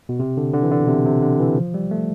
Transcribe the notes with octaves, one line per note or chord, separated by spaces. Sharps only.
B2
C3
D3
D3
E3
D3
B2
C3
C3
D3
E3
F3
G3
A3